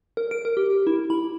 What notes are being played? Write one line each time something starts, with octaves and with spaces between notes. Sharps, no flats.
A#4
D7
A#4
G4
E4
B5